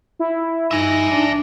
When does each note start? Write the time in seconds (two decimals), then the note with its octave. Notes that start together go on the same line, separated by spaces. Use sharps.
0.19 E4
0.71 G2 D#4 E5 G#5 A#6
1.10 D4